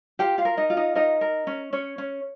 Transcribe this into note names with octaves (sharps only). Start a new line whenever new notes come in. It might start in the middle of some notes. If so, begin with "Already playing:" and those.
F4 G4 G5
F4 F5
A#4
D#4 D#5
F4
D#4 D#5
D#4 A#4 D#5
A#4
C#4
C#4 C#5
C#4